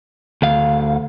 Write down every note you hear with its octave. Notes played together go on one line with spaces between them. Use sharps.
D2 F5